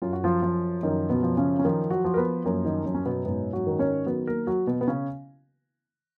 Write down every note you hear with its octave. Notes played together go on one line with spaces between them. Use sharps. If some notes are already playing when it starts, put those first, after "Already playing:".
F#2 F4
F#4
F3 F4
F3
F#2 D#3 D#4
B2 B3
F3
C#3 C#4
C#4
D#3 F3 D#4
F#3 F#4
F3
A#4
B3 B4
F#2 A#3 A#4
D#3 D#4
F#2
C#4
B2 B3
G#2 B2 B3
F#3 F#4
D#3
C#4 C#5
F#3 B3 B4
A#3 A#4
F#3 F#4
B2 B3
B3
C#3 C#4